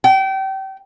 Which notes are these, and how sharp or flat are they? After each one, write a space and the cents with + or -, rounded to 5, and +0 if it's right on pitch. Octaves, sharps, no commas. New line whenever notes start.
G5 -30